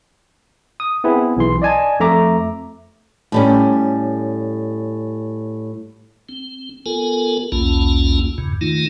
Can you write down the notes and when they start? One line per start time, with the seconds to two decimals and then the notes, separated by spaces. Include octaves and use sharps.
0.80 D#6
1.04 B3 C4 E4 G#4
1.37 B1 E3 C6
1.62 D5 D#5 G#5 A5
2.00 F2 A3 E5 A#5 D6
3.32 A2 G3 C#4
6.29 C4
6.86 B3 F4 A4 A#4 G#5
7.52 B1 E2 A#3 C#4 F4 A5
8.38 E2 G2 C#3
8.61 D#3 A3 D#4 F4